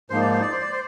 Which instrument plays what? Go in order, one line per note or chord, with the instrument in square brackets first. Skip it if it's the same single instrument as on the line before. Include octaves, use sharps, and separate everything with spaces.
[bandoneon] G#2 F3 A#3 D#4 [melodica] C5
[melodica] D5
C5
D5
C5
D5
C5